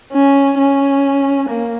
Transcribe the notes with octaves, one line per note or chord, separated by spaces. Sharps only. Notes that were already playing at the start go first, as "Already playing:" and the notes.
C#4
C#4
A#3